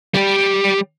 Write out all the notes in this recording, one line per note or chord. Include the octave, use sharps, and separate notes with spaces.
G3 G4